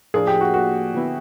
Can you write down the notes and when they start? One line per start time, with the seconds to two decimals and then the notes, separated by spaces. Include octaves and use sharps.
0.14 A2 F3 A#3 D4 G#4
0.27 G4
0.41 F#4
0.54 F#4
0.94 D3 F#3 B3 E4